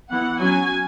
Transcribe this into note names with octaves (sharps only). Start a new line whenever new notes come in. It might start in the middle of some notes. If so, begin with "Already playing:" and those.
E3 B3 F#5
F#3 C#4 G#5